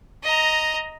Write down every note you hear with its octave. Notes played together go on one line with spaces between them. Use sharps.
D#5 A#5